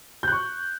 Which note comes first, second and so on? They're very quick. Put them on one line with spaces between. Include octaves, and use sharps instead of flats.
G6 F#6 C#6